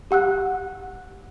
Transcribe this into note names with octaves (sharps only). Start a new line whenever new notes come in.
G4 F#5 E6 F#6